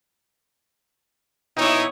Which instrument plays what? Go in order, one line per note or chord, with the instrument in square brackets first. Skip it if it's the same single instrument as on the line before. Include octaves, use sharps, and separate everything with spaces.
[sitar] A#2 E4 [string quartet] B3 C#5 D#6 [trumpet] D#4